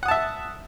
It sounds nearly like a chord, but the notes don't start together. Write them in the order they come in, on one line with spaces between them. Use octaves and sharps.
F#5 D#6 A5 E5